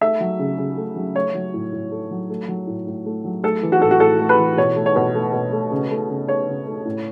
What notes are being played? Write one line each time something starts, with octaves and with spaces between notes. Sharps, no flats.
A3 E5
F#3
C#3
C#3
A3
F#3
A3 C#5
F#3
A2
A2
A3
F#3
A3
F#3
A2
A2
A3
F#3
A3 A4
E3
F#4
A2 A4
F#4
A2 A4
A3
B4
E3
B2 C#5
A3
C#5
B2
A3
B2
A3
C#3
A3
C#3
A3 C#5
C#3
A3
A2